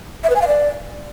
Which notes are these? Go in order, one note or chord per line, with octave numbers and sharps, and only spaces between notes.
E5
B4
G#5
F5
D5